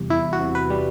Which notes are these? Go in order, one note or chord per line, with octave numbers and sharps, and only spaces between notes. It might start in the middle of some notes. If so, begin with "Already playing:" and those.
Already playing: E2 C3 G3
E2 E4
F#4
C3
B4
G3